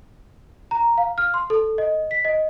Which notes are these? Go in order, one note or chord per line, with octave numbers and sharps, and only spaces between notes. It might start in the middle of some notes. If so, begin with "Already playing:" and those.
A#5
F5
F6
C6
A4
D#5
B6
D#5